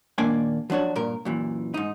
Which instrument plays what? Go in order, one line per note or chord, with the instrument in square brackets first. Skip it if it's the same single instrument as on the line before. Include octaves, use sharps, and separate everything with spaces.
[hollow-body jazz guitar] D#2 A#2 A#3 D4 D5 G#5
F3 F#3 D4 F#4 C#5
G2 A#2 A#4
F#2 A#2 E3
G#2 D#4